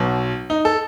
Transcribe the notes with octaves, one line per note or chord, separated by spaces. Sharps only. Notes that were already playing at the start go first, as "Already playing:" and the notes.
Already playing: B1 B2
D#4
A4